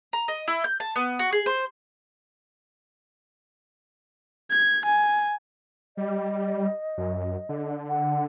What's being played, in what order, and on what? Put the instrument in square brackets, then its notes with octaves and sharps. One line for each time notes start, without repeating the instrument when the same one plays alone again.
[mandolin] A#5
D#5
E4
G6
A5
B3
F#4
G#4
C5
[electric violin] G#6
G#5
[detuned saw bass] G3 [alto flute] D#5
[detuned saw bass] F#2
D3
[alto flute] F#5